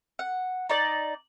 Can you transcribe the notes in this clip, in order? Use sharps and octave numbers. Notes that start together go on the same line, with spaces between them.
F#5
D#4 D5